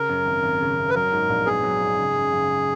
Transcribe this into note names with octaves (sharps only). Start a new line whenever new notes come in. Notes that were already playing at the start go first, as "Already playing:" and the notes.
Already playing: C#3 A#4
F#2
G#1
G#1
C#3
F#2
B4
F#3 A#4
G#2
A#1
B3 G#4
F#3
G#2
C#3
F#2
F#1